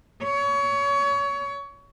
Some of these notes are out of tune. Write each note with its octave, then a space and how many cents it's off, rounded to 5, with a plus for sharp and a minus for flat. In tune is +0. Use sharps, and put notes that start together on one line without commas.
C#5 +25